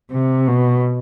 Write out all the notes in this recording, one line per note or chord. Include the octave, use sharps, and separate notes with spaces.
C3
B2